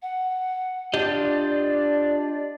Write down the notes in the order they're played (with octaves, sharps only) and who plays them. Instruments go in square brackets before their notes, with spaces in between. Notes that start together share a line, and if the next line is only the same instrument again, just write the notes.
[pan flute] F#5
[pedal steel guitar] D4 F4 [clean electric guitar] G4 D#5 [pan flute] D5